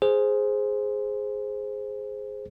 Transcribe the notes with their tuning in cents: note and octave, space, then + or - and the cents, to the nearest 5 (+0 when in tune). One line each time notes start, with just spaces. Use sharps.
G#4 +0 C5 +0